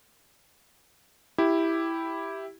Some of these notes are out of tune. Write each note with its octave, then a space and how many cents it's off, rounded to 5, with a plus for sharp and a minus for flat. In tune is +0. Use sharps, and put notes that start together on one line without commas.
E4 +0 G4 +0